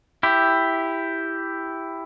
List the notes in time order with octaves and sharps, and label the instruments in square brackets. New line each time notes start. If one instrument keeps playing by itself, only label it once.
[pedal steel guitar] E4 G4